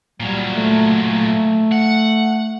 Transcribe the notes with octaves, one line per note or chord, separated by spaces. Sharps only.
A#2 F#3 G3
A3
A3
F#5